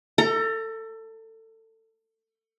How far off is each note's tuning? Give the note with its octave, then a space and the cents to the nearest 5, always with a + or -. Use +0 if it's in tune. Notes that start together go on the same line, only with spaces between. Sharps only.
A4 +25 A#5 -10